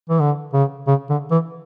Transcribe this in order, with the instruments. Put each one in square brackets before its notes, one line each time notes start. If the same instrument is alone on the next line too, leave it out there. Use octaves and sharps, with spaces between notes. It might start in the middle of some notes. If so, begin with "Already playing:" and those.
[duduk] E3
D3
C#3
C#3
D3
E3